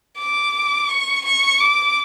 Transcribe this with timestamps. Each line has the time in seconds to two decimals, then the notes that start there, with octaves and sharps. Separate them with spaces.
0.19 D6
0.89 C#6
1.25 C#6
1.60 D6